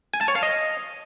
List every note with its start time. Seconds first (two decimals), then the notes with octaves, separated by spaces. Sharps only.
0.14 G#5
0.21 A5
0.28 C#5
0.35 F5
0.43 D#5